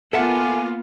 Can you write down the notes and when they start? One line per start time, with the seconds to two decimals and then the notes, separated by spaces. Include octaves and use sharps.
0.13 A#3 B3 F4 A4 E5 F#5 G#5 D6